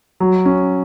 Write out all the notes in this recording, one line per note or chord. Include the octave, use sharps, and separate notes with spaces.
F#3
C#4